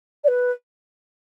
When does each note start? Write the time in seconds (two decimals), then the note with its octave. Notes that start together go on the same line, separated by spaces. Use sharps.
0.24 D5
0.28 B4